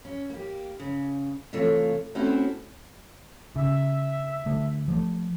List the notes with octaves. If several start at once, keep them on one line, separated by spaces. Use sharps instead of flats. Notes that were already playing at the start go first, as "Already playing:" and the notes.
C#4
A#3 G4
C#3
C3 E3 A3 F4 C#5
A3 C4 C#4 E4 F#4 A4
C#3 E5
D3 A3
F3 G#3 A3